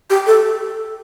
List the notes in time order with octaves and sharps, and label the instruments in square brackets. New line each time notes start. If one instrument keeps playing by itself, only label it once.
[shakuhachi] G4
A4